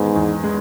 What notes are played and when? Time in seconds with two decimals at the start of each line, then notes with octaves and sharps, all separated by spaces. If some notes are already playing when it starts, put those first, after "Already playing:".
Already playing: E2 G#2 D#3 G#3 B3
0.16 E2
0.44 G#3